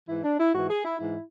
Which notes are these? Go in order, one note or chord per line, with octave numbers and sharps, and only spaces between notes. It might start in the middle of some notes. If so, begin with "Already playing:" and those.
G#2 E3 E4
D4
E4
G#2 E3 F#4
G#4
E4
G#2 E3 E4